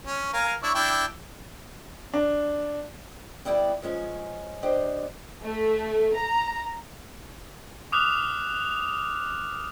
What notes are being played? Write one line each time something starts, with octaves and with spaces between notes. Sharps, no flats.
C#4
A#4 F5 G#5
D4 E4 C#5
D4 E4 G5
D4
G3 B3 E4 D5 G5
F3 G#3 C#4 G#5
D4 G4 C5 D#5
A3
A#5
D6 D#6 F6 F#6 F7